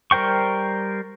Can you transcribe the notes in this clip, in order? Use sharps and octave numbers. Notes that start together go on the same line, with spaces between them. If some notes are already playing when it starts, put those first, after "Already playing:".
G3 A#4 C5 G5 C#6